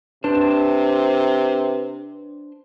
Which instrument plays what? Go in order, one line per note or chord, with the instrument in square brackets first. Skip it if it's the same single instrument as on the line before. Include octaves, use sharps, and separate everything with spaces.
[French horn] C3 [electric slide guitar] D4 C5 A5 [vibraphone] B4